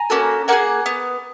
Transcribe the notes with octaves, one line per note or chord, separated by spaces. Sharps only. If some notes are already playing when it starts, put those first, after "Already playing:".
Already playing: G#5 A#5
A#3 C#4 F#4 A4
A#3 D#4 G#4 F#5 G#5
B3